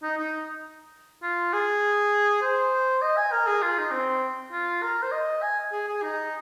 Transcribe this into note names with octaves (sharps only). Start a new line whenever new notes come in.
D#4
D#4
F4
G#4
C5
D#5
G#5
A#4
G#4
F4
D#4
C4
F4
A#4
C5
D#5
G#5
G#4
G#4
D#4